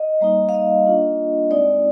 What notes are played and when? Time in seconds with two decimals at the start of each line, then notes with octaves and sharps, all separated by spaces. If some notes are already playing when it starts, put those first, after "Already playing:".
Already playing: D#5
0.21 G3 A#3 D#4
0.49 F5
0.54 D#5
0.85 A#3 D4 F4
1.51 G#3 C4 D#4 D5